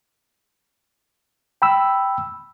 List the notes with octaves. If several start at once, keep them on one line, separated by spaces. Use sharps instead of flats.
G5 B5 E6